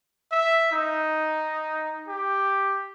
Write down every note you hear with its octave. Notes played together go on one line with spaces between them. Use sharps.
E5
D#4
G4